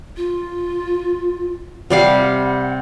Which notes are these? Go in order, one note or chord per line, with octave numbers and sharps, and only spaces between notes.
F4
C3 G3 F5 F#5